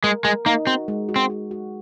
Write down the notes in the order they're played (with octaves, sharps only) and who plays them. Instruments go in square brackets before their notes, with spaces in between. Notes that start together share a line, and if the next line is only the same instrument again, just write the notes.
[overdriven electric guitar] G#3 [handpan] A#4
[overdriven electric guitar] G#3 [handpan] A#4
[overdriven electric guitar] A#3 [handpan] D#4
[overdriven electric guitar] C4 [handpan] F#4
[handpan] G#3
F#4
[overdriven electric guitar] C4
[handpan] F#4
F#4